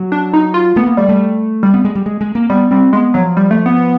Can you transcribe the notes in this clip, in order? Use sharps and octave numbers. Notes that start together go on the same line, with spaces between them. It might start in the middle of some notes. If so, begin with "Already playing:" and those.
Already playing: F#3
D4
D#4
F4
A3 B3
A#3
G3 A3
A3
G3
B3
G#3
G3
G#3
G#3
A#3
G3 B3
G3 C4
G#3 B3
F3 F#3
G3
A3
B3